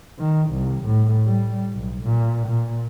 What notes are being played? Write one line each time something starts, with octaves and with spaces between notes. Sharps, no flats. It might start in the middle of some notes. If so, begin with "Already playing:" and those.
D#3
C2
A2
G3
B1
A#2
A#2